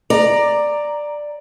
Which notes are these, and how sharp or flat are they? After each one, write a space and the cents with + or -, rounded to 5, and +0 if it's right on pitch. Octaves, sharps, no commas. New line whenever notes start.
D5 +10 A#5 +0